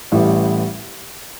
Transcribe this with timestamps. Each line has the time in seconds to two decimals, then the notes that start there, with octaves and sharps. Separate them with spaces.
0.12 A1 A2 E3 G3